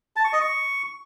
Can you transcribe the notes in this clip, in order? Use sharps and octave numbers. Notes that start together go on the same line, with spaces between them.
A5
C#6
D#5
C#6